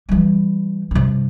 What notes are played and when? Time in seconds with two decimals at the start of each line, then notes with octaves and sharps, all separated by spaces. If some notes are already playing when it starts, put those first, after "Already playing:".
0.09 E3 G3
0.91 G2 C3